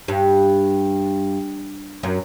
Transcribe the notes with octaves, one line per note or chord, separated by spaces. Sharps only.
G2
F#2